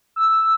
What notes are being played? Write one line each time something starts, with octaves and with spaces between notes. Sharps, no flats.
E6